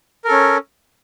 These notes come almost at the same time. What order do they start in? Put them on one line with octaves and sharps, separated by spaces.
A#4 A4 C#4